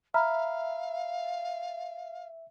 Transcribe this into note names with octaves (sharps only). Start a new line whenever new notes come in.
E5 F5 A#5 B5 F6